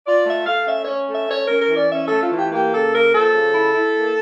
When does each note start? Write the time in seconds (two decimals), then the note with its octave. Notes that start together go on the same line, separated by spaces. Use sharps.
0.06 F4 D5
0.25 A3 E5
0.46 A3 F5
0.67 C#4 E5
0.83 C#4 C#5
1.08 A3
1.13 E5
1.29 C#4 C#5
1.44 A#4
1.49 C#4
1.60 A#4
1.69 E3
1.75 D5
1.90 C#4 E5
2.05 A4
2.11 A3
2.20 F4
2.31 E3
2.36 G4
2.51 A#3 G4
2.72 C#3 A4
2.93 A#3 A#4
3.13 F3 A4
3.34 C#3
3.54 E4
3.75 E4
3.95 A#3